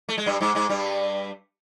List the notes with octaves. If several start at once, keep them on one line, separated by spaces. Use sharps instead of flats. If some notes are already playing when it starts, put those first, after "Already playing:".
A3
G#3
G2 G3
G#2 G#3
G#2 G#3
G2 G3